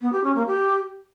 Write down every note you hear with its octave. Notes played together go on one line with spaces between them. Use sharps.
B3
G4
C#4
A#3
G4